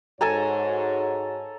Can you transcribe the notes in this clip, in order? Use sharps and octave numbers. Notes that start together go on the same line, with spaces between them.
G#2 F#4 A4 C#5 G#5 A#5